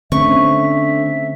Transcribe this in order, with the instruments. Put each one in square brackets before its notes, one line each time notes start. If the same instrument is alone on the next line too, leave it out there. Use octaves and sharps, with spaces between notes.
[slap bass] D3 [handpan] A3 C4 C#4 [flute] E5 [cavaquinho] C#6